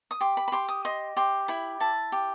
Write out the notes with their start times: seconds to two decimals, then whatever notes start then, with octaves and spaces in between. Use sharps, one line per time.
0.11 D#6
0.21 G4 C6
0.37 B5
0.48 B5
0.52 G4 C6
0.69 D#6
0.85 D#5 C6
1.17 G4 C6
1.48 E4 B5
1.80 E4 A5
2.12 G4